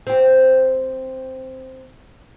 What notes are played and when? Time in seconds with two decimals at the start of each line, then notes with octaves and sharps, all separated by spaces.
0.07 C4 G4